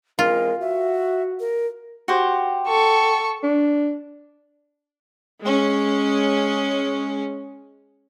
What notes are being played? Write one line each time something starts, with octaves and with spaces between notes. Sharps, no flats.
E3 G#3 C4 F4 A#4
F#4 E5
A#4
F#4 G4 C5
A4 C#6
D4
G#3 C#4